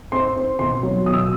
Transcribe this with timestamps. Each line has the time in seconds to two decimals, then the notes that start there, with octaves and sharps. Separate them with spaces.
0.12 C4 C6
0.36 C4
0.59 B2 C6
0.83 F#3
1.06 B2 D#6
1.14 E6